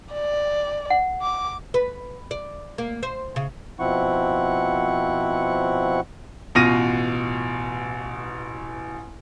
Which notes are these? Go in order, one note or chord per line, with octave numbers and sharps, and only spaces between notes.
D5
F#5
D6
B4
D5
A#3
C5
C#3
B2 F3 C4 E4 F#5 C#6
A1 B2 F4 F6 A#6 D#7